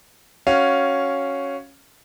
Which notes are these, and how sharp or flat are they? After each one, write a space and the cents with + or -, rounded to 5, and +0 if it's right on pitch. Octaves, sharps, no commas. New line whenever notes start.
C#4 +0 F#4 +10 F5 +0